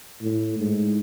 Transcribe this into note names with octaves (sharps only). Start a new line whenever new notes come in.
A2
G#2